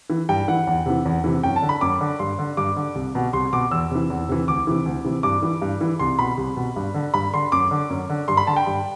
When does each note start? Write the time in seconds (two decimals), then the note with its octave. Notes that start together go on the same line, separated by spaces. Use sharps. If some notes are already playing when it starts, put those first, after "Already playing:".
0.10 E3
0.29 G2 G5
0.48 E3 F#5
0.67 E2
0.86 C3 E3
1.05 E2
1.24 C3 E3
1.43 F#2 G5
1.56 A5
1.62 D3
1.69 B5
1.81 F#2 D6
2.01 D3
2.19 G2 C6
2.39 D3
2.57 G2 D6
2.76 D3
2.95 C2
3.15 B2
3.33 C2 C6
3.52 B2 D6
3.71 E2 E6
3.91 C3 E3
4.10 E2
4.29 C3 E3
4.48 D2 D6
4.67 C3 E3
4.86 D2
5.05 C3 E3
5.23 G2 D6
5.43 E3
5.62 G2
5.81 E3
5.99 C2 C6
6.19 B2 B5
6.37 C2
6.56 B2
6.76 G2
6.94 D3
7.14 G2 B5
7.33 D3 C6
7.52 F#2 D6
7.71 D3
7.90 F#2
8.10 D3
8.28 G2 C6
8.37 B5
8.47 D3 A5
8.56 G5
8.67 G2